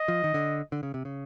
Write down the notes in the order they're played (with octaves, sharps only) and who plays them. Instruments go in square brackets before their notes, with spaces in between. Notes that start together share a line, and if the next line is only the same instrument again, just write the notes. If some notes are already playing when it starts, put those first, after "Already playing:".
Already playing: [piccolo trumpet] D#5
[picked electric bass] F3
D#3
D3
D3
C#3
C3
C#3